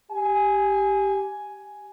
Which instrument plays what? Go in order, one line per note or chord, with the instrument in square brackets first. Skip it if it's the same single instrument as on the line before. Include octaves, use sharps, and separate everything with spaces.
[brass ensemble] G4 G#5